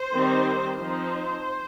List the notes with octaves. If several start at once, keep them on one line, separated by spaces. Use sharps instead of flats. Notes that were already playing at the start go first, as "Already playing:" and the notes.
Already playing: C5
D#3 G3 C4 D#4
F3 C4 D#4 C5